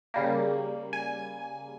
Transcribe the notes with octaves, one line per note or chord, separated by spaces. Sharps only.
C#3 G3 A#3
G#5